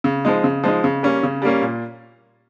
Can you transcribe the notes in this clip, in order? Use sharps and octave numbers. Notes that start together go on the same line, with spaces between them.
C#3
F3 G#3 D#4
C#3
F3 G#3 D#4
C#3
G3 A#3 C#4
C#3
G3 A#3 C#4
A#2